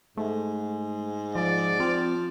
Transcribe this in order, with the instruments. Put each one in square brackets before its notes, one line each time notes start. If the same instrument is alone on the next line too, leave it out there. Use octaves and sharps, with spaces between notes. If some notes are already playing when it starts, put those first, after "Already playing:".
[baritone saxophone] G#2 [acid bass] A3
[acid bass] F3 [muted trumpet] D5
[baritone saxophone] F3 [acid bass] C4